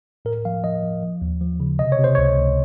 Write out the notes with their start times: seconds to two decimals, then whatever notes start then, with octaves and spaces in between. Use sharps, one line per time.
0.25 A2 A#4
0.45 F3 F5
0.64 F3 D#5
0.83 F3
1.03 F3
1.22 D#2
1.41 F3
1.60 C#3
1.79 C3 D#5
1.92 C#5
1.99 C3
2.04 C5
2.15 C#2 C#5
2.37 C#2